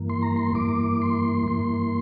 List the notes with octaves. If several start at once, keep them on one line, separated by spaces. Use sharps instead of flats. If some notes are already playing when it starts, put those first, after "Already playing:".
Already playing: G2 E3 A#3
C6
A#5
C6
G2 E3 A#3 D6
C6
G2 E3 A#3 C6